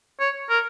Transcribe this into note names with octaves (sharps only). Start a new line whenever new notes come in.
C#5
A#4